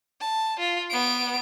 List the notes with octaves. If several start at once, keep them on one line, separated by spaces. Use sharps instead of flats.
A5
F4
B3 D7